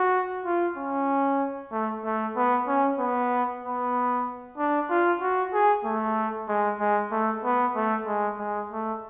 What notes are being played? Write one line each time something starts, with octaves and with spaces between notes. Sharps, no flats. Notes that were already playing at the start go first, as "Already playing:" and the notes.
Already playing: F#4
F4
C#4
A3
A3
B3
C#4
B3
B3
D4
F4
F#4
G#4
A3
G#3
G#3
A3
B3
A3
G#3
G#3
A3